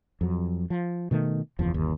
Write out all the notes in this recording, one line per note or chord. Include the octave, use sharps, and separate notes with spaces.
F2 F#3
F3
B2 D#3 A3
F#1 E2 F3
G1 D#2